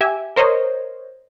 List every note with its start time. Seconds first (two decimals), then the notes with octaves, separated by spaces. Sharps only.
0.01 G4 E5 G#5
0.36 A#4 C5 C#5 D#5